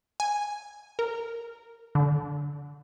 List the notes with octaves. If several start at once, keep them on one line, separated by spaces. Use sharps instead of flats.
G#5
A#4
D3